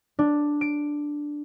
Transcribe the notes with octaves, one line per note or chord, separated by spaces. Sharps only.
D4
D7